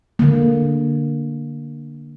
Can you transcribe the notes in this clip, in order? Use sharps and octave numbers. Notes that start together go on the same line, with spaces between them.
D3 A#3